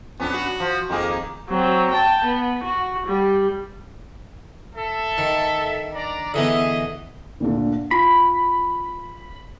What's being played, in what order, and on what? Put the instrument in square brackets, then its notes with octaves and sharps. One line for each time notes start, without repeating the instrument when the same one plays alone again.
[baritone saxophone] F2 [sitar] B3 C#4 D4
[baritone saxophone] F#4
[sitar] F3
[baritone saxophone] F2 [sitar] D#3 A#3 G#4
[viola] F#3 C4
G5 A5
B3
F#4
G3
[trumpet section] A4 E5
[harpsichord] D#3
[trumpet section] D4 D5 A#5
[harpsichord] D3 E3 B3 [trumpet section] G#4 D#5 E5
[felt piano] D2 A#2 D3
[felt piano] F4 [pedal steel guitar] B5